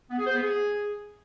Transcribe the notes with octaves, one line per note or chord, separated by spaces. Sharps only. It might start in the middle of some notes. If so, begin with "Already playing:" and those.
B3
G#4
C5
B3
G#4